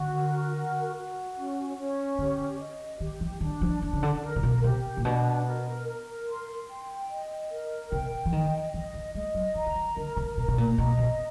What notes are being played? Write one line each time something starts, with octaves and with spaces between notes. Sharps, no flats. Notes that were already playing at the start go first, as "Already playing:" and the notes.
Already playing: D3 F#4
A#4
F#4
F#4
C#4
C#4
D3 G4
D#5
D#3 G4
E3
D#3 D4
F3
E3 D4
C#3
D3
A#4
C3
B2
C3 G4
A#2
B2 D4
A#4
A#4
C6
G5
D#5
A#4
C3 G5
E3
D#3 D#5
E3 D#5
E3
G#3 D#5
F#3
E3 A#5
D3
D#3
D3 A#4
C3
B2 A#5
B2
A#2
B2 D#5
C3